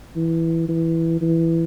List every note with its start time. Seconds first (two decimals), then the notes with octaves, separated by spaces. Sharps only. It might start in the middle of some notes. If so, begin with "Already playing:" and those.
0.16 E3
0.69 E3
1.21 E3